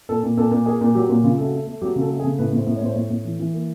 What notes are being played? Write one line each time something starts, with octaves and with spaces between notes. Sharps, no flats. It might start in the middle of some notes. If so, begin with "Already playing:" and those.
A#2 A4
A#2
A#2 A4
A#2
A#3 G#4
A#2
F#3 G4
A#2
C#3 F4
A3
F#4
A3
A3
F#3 G4
C#3 A4
A3
G#4
C#3
A2 B4
A2
C5
A2
C#5
A2 C5
A2 C#5
A2
E3
E3
A#3